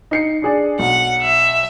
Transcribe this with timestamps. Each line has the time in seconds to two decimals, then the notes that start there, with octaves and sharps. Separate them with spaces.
0.11 D#4 C7 C#7
0.42 D4 G#4 D5
0.79 B1 F#5
1.21 E5